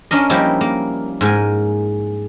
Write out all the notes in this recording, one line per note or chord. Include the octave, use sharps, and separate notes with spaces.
C#4 D4 A#4 D#5
F3 G3 A#3 D#4 E4
A#3
G#2 A#4 G#5